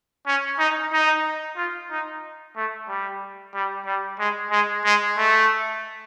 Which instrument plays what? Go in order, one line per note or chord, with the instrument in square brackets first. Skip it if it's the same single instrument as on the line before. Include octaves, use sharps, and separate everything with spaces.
[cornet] C#4
D#4
D#4
F4
D#4
A3
G3
G3
G3
G#3
G#3
G#3
A3